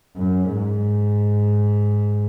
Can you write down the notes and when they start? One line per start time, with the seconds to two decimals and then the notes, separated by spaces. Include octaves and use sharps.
0.17 F#2
0.56 G#2